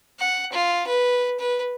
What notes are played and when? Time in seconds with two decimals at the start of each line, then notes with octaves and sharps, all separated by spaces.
0.19 F#5
0.52 F4
0.87 B4
1.39 B4